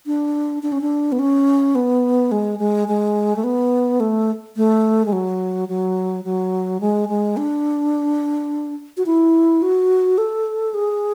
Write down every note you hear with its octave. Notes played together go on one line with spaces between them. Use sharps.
D4
D4
C#4
D4
B3
C#4
B3
G#3
G#3
G#3
A3
B3
A3
A3
G#3
F#3
F#3
F#3
G#3
G#3
D4
F#4
E4
F#4
A4
G#4